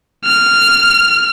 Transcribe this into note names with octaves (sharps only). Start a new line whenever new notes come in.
F6